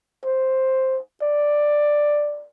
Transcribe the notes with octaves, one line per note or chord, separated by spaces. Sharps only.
C5
D5